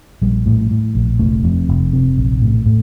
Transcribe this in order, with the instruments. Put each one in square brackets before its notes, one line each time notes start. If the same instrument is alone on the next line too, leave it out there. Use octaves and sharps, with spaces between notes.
[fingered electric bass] A#1 G3
A2
A2
A#1
F1 A3
F2
F1
C3
A#1
A2
A2